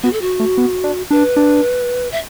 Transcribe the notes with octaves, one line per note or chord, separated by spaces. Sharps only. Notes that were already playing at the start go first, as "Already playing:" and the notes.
B3 F#4
A4
F#4
A3
B3
D4
D4 B4
D4
E5